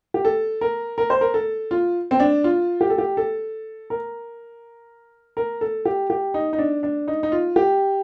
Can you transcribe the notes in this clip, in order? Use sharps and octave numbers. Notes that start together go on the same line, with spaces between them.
G4
A4
A#4
A#4
C5
A#4
A4
F4
C4
D4
F4
G4
A4
G4
A4
A#4
A#4
A4
G4
G4
D#4
D#4
D4
D4
D#4
D#4
F4
G4